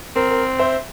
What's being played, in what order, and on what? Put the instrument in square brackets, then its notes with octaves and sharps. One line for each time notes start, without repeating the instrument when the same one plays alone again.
[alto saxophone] C4 [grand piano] A#4
[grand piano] A#4
C5 E5